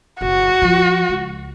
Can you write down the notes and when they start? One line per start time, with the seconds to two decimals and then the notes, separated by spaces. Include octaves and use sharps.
0.21 F#1 F#4
0.62 F3
1.09 C#2